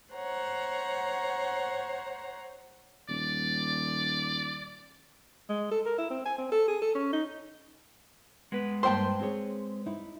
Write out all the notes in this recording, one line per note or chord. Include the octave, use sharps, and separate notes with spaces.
C5 C#5 F#5 A#5
D#1 D5
G#3
A4
A#4
E4
C4
G#5
C4
A4
G#4
A4
C#4
D#4
G#3 B3 B4
G2 A#3 C5 G5 A5 C6
C4 G#4 C#5
D#4 E4